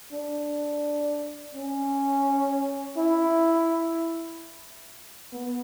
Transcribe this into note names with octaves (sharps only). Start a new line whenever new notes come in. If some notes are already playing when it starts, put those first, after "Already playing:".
D4
C#4
E4
B3